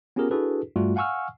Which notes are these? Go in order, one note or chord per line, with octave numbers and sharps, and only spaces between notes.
B3 C#4 F4 G4 G#4 A#4
D4 E4 F#4 G#4 A4 B4
G2 G3 A3 F4 F#4
F5 F#5 G#5 C#6 E6 F6